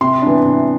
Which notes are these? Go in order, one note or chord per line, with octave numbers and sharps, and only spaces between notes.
C3 C6
E3 B3 D4
C3